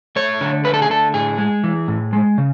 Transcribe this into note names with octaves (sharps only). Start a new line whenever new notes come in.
A3 C#5
D3
A3 B4
A4
G#4
D3 A4
A2 G#4
G#3
E3
A2
G#3
C#3